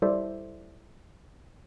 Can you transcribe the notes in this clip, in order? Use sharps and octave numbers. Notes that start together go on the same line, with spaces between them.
G3 E4 A4 C5 D5 E5